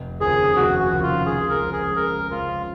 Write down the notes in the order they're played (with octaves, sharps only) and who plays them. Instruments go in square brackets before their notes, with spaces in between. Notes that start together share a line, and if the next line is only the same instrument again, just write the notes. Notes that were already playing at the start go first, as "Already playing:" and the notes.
Already playing: [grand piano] F1
[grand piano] D#2 C#3 F3 [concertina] G#4
[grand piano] F1 [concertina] F#4
[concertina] F#4
[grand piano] D#2 C#3 F3
[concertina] F4
[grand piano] C#2 [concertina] G#4
[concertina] A#4
[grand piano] C#3 F3 G#3
[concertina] G#4
[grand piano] C#2 [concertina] A#4
[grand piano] C#3 F3 G#3 [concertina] F4